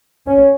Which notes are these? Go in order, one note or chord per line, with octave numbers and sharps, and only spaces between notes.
C#4